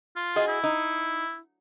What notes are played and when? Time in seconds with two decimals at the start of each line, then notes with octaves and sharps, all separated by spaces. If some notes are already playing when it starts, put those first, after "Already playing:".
0.16 F4
0.36 F#4 G#4 D#5
0.48 E4
0.64 D#4